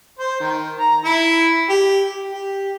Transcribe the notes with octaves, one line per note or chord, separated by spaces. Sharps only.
C5
D#3
A#5
E4
G4
G4